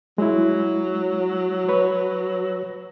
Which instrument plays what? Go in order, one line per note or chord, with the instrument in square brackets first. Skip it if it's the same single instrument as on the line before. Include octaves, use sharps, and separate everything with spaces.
[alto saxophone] F#3 [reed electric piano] G#3 E4
[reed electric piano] B4 C#5